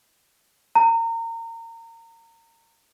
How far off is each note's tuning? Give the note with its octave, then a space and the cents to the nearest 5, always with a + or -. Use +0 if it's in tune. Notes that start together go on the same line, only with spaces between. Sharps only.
A#5 -30